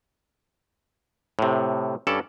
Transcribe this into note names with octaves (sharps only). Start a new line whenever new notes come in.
A2 C3
G2 C#4 A4 D5 A5